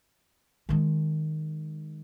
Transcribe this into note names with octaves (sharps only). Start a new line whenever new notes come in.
D#3 G#3